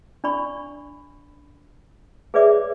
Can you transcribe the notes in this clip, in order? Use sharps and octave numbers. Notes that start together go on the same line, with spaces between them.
D4 D5 B5 C#6
G#4 B4 C#5 D5 E5 D6